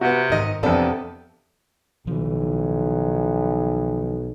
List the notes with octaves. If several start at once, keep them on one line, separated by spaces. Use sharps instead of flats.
C3 B3 F#4
G#2 D#3 D#4 D#5
F2 C3 B3 C4 D4 A4
B1 D#3 F3